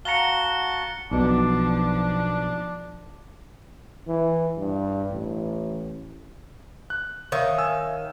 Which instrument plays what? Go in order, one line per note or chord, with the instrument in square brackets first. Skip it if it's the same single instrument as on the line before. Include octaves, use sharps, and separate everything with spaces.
[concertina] F#4 A5 [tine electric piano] F5 F#5 A#5 [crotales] C#7 G7
[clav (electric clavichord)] B1 B2 [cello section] F3 [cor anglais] D4
[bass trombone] E3
G2
A1
[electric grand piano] F#6
[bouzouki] D#3 [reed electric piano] C#5 E5 F5
[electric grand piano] G#5 E6